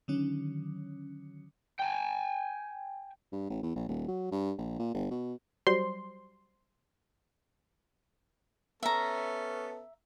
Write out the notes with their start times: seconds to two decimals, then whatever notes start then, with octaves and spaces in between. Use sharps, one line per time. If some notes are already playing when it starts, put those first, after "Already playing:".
0.08 D3 D#3 F#3 C#4
1.79 G5 G#5
3.32 G2
3.50 A1
3.63 E2
3.76 A#1
3.88 D#1
4.08 F#3
4.31 G2
4.58 A#1
4.79 A#2
4.94 G1
5.11 B2
5.67 F#3 G3 C5 C6
8.83 B3 C#4 A4 E5 A#5